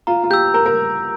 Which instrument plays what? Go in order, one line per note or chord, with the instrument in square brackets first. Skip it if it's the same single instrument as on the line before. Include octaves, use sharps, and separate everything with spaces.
[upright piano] F4 [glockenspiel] A#5
[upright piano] F4
[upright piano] G4 [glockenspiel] E6 G6
[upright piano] A#4 [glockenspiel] A#5
[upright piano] A#4